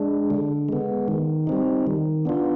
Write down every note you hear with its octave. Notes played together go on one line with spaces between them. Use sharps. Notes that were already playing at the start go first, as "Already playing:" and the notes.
Already playing: G#3 D4
D3
G#3 B3
D#3
G3 C4 D#4
D#3
B3 D4 F4